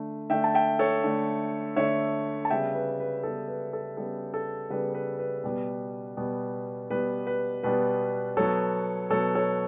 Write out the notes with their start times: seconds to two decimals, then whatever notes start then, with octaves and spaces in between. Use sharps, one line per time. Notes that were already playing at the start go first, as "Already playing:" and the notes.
Already playing: D3 A3
0.30 D3 A3 E5 G5
0.44 A5
0.55 E5 G5
0.79 A4 C#5
1.04 D3 A3
1.76 D3 A3 C#5 E5
2.45 A5
2.50 C#3 G3 B3 E5 G5
2.75 B4
3.00 B4
3.23 C#3 G3 B3 A4
3.48 B4
3.73 A4
3.97 C#3 G3 B3 A4
4.34 A4
4.70 C#3 G3 B3 B4
4.94 B4
5.19 B4
5.43 B2 G3 B3
6.17 B2 G3 B3
6.91 B2 G3 B3 B4
7.27 B4
7.63 B2 G3 B3 B4
8.37 B2 F#3 B3 A4 C#5
9.10 B2 F#3 B3 A4 C#5
9.35 A4 C#5